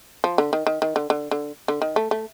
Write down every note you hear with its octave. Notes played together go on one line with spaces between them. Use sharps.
F3
D3
D#3
D#3
D#3
D3
D3
D3
D3
D#3
A3
A3